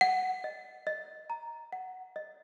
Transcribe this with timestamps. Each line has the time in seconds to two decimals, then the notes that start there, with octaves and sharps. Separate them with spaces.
0.01 F#5
0.44 D#5
0.87 D#5
1.30 A#5
1.73 F#5
2.16 D#5